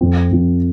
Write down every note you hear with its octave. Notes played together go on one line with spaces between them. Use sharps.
F2 F3 C4
F2 F3 C4